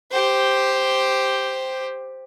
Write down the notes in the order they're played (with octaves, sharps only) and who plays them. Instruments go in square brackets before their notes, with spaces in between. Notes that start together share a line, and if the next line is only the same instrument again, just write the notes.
[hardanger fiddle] G4 C5